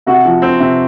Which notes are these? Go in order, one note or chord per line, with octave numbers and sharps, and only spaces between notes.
C3 F#4
F3
C4
C3